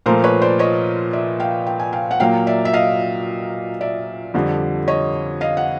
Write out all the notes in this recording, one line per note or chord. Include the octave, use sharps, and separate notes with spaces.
A#2 F3 A3 A#4 C5
B4 C#5
C5 D5
C#5 D#5
D5 E5
F5 G5
G5
G#5
F5 G5
F#5
A#2 F#3 A#3 F5 G5
D5 E5
E5
D#5 F5
D5 E5
F2 D3 G3
C#5 D#5
D#5 F5
F#5